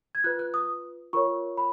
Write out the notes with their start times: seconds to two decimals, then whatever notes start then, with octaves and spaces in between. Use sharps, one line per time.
0.15 G#6
0.24 F4 B4 F#6
0.39 F#6
0.54 D#6
1.13 F4 A#4 C#5 C#6
1.57 B5